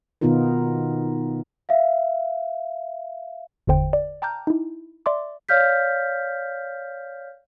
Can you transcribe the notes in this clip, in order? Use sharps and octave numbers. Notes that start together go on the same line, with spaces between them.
B2 D#3 B3 D#4 F4 A#4
E5 F5
G1 E2 D3 C5 G5
D5
G5 A5 A#5 D6 F6 G6
D#4 E4
D5 E5 C6 D6
C#5 D5 F5 F6 G6 B6